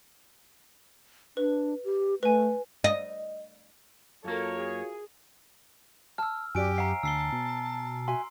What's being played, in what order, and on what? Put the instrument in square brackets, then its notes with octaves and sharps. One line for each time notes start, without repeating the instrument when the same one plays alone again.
[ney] D4 [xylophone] B4
[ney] G4
[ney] A3 [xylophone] B4 G#5
[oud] D#5
[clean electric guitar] F#2 A#3 [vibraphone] F4 F#4 F5 [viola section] A4 A#4 [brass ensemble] C#5
[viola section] G#4
[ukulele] A5 [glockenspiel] E6 F6
[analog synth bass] F#2 [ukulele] F#4 D5 [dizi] G4 [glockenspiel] G#5 D7
[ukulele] C#5 E5 F#5 [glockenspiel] A#5 C7
[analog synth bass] D2 [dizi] A5 [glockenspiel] E6 C7 G7
[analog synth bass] B2
[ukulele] F#4 E5 G#5 [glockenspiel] C6